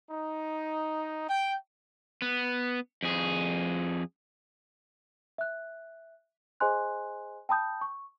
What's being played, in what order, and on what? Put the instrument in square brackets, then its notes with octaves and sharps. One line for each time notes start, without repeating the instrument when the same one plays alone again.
[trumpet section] D#4
G5
[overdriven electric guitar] B3
F2 G#4
[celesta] E5 F#6
G#4 C5 D#5 G#5 C6 F#6
G5 A5 B5 D#6 G6
C#6